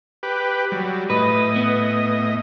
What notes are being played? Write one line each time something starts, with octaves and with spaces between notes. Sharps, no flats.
G4 B4
F#3 G3
A2 B4 D#5
B3